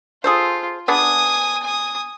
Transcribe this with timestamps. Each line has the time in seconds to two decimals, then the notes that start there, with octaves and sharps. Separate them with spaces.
0.24 F4 G#4 A4 C5
0.88 B3 D4 G#4 G#5 D#6
1.63 G#5 D#6